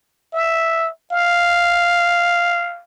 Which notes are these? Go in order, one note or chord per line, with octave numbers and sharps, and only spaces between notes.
E5
F5